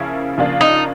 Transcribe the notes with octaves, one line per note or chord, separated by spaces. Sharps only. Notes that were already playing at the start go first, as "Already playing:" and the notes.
Already playing: C#3 F3 A#3 C#4 E4
C#3 F3 A#3 D4 F4
D#4